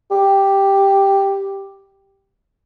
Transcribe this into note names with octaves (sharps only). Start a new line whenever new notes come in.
G4